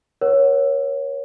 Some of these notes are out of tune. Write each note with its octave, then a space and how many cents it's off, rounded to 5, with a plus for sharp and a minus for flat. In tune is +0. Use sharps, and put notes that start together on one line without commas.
A#4 +40 C#5 +0 F#5 +0